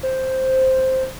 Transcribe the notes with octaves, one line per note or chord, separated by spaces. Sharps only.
C5